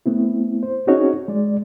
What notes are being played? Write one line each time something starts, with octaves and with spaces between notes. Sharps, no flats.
A3 B3 C4 E4
C5
C4 C#4 D#4 F#4 G#4 C#5
G#3 D5